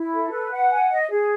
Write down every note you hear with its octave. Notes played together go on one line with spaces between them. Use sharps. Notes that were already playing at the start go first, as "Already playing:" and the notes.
Already playing: E4
A4
B4
F#5
G#5
D#5
G#4